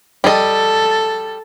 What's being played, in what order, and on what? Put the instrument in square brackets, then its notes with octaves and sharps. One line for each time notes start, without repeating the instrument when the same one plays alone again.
[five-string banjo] G3 D#5 [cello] A4